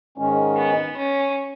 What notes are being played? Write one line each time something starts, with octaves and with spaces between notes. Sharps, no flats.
G#2 D#3 G#3 C#4
B3
C#4